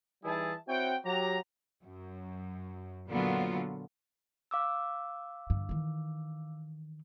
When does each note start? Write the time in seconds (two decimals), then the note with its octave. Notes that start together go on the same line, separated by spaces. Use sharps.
0.24 E3 G3 D#4 E4 G#4 A5
0.69 C4 E4 F#4 C#5 G5
1.05 F#3 G4 A#5
1.83 F#2
3.10 A#2 D3 F#3 B3 F4
4.51 F5 D6 E6
5.50 G2 D3
5.69 D#3 E3